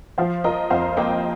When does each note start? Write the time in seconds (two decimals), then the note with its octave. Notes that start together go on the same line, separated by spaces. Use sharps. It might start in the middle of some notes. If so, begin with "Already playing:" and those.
0.18 F3 C5 F5
0.44 F4 A#4 D#5
0.70 F2 C5 F5
0.97 A#3 D#5 G5